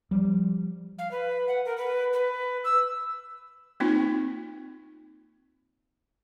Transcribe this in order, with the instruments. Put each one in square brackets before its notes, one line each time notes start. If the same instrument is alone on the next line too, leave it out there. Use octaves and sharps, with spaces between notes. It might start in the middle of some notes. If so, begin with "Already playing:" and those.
[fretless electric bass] F3 G3
[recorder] F5
B4
F#5
A#4
B4
B4
E6
[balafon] A#3 C4 D#4 F4